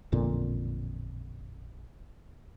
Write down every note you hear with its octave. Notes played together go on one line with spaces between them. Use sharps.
A1 F2 A#2 D3